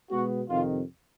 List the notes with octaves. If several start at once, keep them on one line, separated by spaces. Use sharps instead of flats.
B2 G#3 B3 F#4
F2 C3 D#3 F4